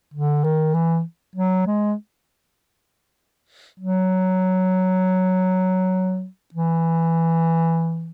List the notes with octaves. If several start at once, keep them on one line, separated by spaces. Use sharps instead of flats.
D3
D#3
E3
F#3
G#3
F#3
E3